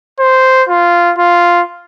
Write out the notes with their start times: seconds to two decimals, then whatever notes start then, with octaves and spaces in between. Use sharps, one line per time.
0.20 C5
0.69 F4
1.18 F4